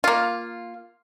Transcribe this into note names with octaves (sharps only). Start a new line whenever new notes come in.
A#3 F4